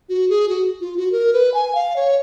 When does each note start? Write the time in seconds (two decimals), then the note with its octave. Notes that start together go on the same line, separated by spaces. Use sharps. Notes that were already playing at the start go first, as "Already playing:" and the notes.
0.09 F#4
0.30 G#4
0.50 F#4
0.81 F4
0.97 F#4
1.12 A#4
1.33 B4
1.54 G#5
1.75 F5
1.96 C#5